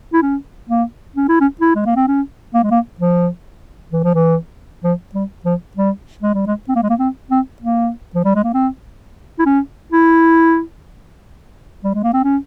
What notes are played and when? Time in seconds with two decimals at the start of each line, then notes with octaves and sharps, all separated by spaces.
0.13 E4
0.22 C#4
0.69 A#3
1.16 C#4
1.28 E4
1.40 C#4
1.61 E4
1.75 G#3
1.86 A#3
1.96 C4
2.07 C#4
2.54 A#3
2.63 G#3
2.71 A#3
3.00 F3
3.92 E3
4.04 F3
4.15 E3
4.84 F3
5.15 G3
5.45 F3
5.77 G3
6.22 G#3
6.34 G3
6.47 G#3
6.68 C4
6.76 A#3
6.83 G#3
6.90 A#3
6.99 C4
7.31 C4
7.62 A#3
8.15 F3
8.25 G3
8.35 G#3
8.44 A#3
8.54 C4
9.39 E4
9.46 C#4
9.92 E4
11.84 G3
11.94 G#3
12.04 A#3
12.13 C4
12.23 C#4